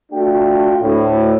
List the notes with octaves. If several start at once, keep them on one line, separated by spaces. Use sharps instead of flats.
A3 D4 F4 F#4 G5
D2 A2